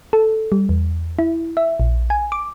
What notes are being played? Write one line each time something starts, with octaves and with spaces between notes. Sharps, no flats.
A4
G3
E2
E4
E5
A#1
G#5
D6